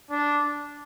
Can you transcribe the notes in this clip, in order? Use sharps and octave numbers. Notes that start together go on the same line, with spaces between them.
D4